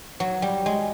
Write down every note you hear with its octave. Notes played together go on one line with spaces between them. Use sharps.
F#3
G3
G#3